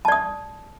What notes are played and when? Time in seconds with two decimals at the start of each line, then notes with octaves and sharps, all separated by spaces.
0.05 A5
0.08 D5
0.12 D#6